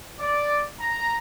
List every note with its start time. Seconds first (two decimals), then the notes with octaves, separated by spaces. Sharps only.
0.20 D5
0.79 A#5